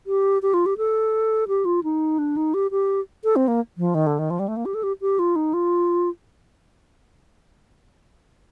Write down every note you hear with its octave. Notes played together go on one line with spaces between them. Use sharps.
G4
G4
F4
G4
A4
G4
F4
D#4
D4
D#4
G4
G4
A4
C4
A#3
F3
D#3
D3
D#3
F3
G3
A3
A#3
G4
A4
G4
G4
F4
D#4
F4